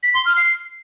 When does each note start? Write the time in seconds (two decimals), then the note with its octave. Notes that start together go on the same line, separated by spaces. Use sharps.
0.03 B6
0.14 C6
0.25 F6
0.37 C7